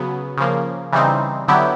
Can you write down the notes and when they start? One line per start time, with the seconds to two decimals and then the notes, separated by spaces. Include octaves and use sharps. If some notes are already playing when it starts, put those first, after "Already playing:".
Already playing: C#3 F#3 B3
0.38 C#3 F3 A#3
0.92 C#3 E3 G3 C4 D#4
1.48 D3 F#3 B3 E4 G4